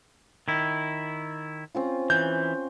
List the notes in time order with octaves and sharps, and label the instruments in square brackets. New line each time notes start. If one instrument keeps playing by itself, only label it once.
[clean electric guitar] D#3 E4
[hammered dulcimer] C4 C#4 F4
[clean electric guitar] E3 [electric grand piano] G6